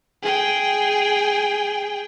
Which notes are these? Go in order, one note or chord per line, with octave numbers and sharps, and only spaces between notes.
G#4 G5